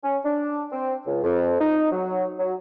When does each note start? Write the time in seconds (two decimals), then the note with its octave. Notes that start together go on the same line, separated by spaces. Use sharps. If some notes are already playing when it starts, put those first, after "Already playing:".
0.04 C#4
0.25 D4
0.72 C4
1.06 C#2
1.24 F2
1.60 D#4
1.92 F#3
2.39 F#3